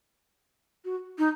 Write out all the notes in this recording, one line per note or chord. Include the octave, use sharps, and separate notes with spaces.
F#4
D#4